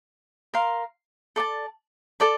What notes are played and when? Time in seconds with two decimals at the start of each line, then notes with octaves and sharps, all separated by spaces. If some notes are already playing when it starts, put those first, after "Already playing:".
0.54 A#4 F5 C6
1.36 A4 D5 A5
2.20 A4 D5 A5